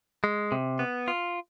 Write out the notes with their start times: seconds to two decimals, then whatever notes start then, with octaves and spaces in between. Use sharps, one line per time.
0.24 G#3
0.52 C3
0.79 B3
1.08 F4